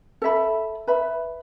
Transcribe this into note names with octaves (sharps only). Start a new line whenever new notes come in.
A4 E5 B5
B4 E5 B5